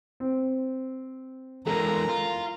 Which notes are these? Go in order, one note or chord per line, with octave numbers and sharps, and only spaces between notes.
C4
E3 G#3 A4 A#4 A#5
F4